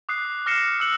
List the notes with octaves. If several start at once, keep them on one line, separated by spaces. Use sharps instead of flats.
D6 D#6 F#6 C7
D6 F6 A#6 C7 C#7 E7
E6 F#6 C#7 F#7